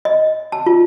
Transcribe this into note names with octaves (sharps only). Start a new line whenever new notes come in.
D#5
A5
F4